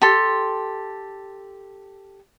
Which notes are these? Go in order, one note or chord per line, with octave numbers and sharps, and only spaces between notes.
G4 A4 C6